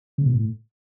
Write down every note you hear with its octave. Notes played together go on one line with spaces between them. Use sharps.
C#3
B2
A2